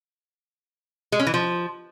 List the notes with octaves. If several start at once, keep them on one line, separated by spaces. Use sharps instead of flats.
G#3
C#4
E3
F3